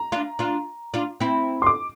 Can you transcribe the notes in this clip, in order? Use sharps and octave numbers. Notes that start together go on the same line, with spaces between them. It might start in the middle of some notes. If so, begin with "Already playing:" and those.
Already playing: A#5
D4 F4
D4 F4
D4 F4
C4 E4
C6
D6